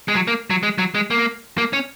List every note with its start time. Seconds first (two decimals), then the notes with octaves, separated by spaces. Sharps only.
0.08 G#3
0.15 F#3
0.27 A#3
0.50 F#3
0.63 G#3
0.78 F#3
0.95 G#3
1.10 A#3
1.58 A#3
1.73 C#4